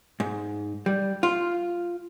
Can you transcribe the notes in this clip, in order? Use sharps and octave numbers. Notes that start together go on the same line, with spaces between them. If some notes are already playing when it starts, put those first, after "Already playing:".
G#2
G3
F4